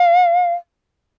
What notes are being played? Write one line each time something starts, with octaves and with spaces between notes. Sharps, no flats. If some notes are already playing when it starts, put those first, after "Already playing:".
Already playing: F5